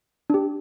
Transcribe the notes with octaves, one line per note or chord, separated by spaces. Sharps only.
D4 G4